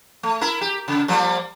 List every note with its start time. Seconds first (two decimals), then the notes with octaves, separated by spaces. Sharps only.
0.23 A3
0.41 E4 A#4
0.61 G4
0.88 C#3
1.08 F3 G3 A#3